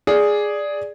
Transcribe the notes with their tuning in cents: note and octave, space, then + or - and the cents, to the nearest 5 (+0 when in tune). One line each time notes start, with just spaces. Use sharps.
G#4 +0 D5 +0